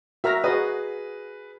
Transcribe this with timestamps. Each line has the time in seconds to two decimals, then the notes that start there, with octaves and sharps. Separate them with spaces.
0.24 F#4 A#4 E5 A#5 F6 A#6
0.44 F#4 G#4 B4 D#5